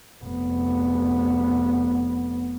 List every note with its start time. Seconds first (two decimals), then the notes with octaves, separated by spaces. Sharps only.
0.25 F1 B3